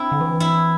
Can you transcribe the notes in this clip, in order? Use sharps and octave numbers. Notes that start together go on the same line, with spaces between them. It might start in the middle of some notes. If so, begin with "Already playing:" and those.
Already playing: C4 D4 E4
D3
E3
E4